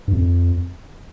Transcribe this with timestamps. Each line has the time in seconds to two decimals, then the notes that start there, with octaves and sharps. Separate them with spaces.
0.08 G2
0.13 F2